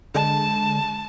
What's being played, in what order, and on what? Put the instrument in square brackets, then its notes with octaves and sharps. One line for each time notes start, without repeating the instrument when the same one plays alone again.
[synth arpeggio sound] D3 G#3 [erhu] A5